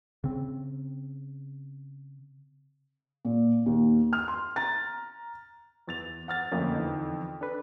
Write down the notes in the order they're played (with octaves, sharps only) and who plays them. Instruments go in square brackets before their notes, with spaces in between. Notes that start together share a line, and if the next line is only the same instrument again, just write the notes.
[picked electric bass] C#3 C4
[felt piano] A#2
D#2
F6
C6
A#5 A6
[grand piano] E2 A6 F7
F#5 F6 A6
[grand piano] F2 D3 [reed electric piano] A3 A#3 C#4
[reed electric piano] E2 E3 D#4
D4 A4 B4